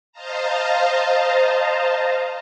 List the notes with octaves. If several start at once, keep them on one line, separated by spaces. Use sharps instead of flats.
C5 D#5 F5 A5 A#5